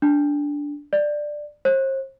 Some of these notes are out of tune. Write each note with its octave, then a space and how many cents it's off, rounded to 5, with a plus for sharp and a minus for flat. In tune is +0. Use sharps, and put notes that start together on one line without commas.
D4 -10
D5 +10
C5 +40